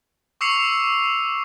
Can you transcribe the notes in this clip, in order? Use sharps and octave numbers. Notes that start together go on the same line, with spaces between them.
C#6 D6 E6 C7 C#7 F7